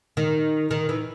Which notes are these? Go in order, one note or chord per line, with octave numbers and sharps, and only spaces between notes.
D#3
D#3
E3